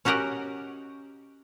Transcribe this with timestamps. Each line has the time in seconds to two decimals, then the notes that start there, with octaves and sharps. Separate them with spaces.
0.05 C#4 F#4 G4 A#4 D#5 F#5